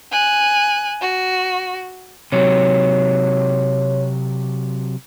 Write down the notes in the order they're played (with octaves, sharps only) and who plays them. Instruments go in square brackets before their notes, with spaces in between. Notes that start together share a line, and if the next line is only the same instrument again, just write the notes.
[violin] G#5 F#6
F#4
[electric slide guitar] C3 F#3 [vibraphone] C#5